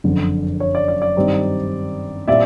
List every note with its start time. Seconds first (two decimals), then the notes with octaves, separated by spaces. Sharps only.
0.04 F#1 F2 D3
0.60 C#5
0.75 D5
0.88 D5
1.02 D5
1.16 G2 D#3 G3 C4 D#4
2.28 A#2 G3 C4 E4 D5 E5